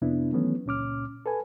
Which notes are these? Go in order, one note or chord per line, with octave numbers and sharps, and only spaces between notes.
F2 C3 B3 D4 E4
D#3 E3 F#3 A3 B3 C#4
C#2 A#2 C#4 D6 F6
A4 B4 G#5